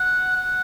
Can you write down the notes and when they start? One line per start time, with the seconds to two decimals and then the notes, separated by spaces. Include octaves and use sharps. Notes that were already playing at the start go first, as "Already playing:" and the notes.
Already playing: F#5
0.36 F#5